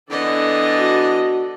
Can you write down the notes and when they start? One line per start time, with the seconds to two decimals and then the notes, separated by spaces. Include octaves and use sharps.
0.10 D3 E3 B3 A4 D5 D#5
0.78 F#4